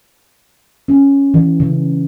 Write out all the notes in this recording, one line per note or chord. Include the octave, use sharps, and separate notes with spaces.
C#4
E3
C#3